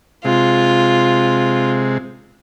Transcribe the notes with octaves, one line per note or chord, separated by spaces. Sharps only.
C3 G#3 F4